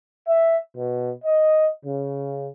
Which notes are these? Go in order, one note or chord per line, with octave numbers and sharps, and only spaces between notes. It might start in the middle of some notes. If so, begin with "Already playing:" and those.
E5
B2
D#5
C#3